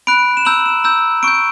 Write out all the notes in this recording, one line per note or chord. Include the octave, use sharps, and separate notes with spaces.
B5 F#6 D7
E7
A#5 E6 G6 F#7
E7
A#5 E6 G6
C#6 G6 D7